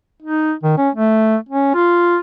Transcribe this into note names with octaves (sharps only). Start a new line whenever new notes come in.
D#4
D#3
C#4
A3
C#4
F4